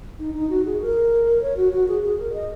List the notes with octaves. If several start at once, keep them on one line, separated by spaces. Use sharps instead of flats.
D#4
D#4
F#4
G#4
A#4
C#5
F#4
F#4
G#4
G#4
A#4
D#5